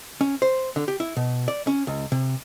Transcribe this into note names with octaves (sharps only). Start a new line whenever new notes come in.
C#4
C5
D3
G4
E4
B2
D5
C#4
C#2
C3